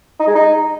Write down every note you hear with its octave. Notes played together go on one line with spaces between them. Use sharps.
D#4
G#3
D#4